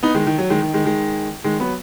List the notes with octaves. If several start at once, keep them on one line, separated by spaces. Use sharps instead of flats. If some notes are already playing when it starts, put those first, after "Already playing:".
B3 D#4
D#3 G#3
D#3
F#3
D#3 G#3
D#3
D#3 G#3
D#3 G#3
D#3 G#3
F#3 B3